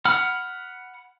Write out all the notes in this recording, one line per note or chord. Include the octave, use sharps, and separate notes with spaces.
F#5 B5 F6